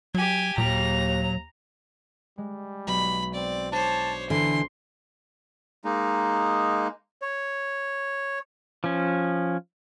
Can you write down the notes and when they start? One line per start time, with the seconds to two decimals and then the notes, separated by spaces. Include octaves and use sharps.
0.15 F#3 G4 G#5
0.58 D#2 A#2 F#3 G5 A#5
2.38 G3 G#3
2.87 B1 B5
3.34 C4 D5
3.72 D4 C5 C#5 A5
4.30 D3 E3 B4 C6
5.85 G#3 A#3 D#4
7.22 C#5
8.84 F3 C#4